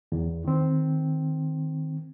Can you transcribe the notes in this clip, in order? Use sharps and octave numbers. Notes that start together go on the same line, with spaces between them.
E2
D#3 C4